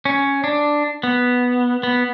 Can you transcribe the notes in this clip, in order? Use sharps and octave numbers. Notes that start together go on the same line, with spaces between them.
C#4
D4
B3
B3